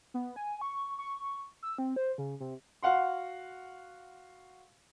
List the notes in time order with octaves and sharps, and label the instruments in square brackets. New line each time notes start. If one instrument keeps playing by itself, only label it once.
[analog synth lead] B3
G#5
C#6
C#6
E6
C4
C5
C#3
C3
[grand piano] F#4 F5 F#5 C6